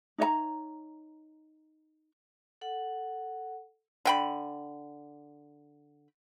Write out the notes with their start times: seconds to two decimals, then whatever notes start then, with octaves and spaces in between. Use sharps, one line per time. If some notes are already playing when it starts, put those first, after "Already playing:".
0.18 D#4 C#5 D#5 A#5
2.61 A4 F#5
4.05 D3 G5 B5